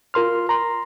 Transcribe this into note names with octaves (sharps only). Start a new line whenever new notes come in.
F4 A#4 C6 F6
A#5 C6